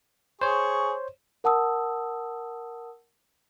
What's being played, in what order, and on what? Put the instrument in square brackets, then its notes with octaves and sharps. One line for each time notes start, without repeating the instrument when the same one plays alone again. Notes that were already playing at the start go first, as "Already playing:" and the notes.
[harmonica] G#4 C#6 [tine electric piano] C5 C#5
[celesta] A#4 F#5 A5 D#6 E6